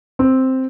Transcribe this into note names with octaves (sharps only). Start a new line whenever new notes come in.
C4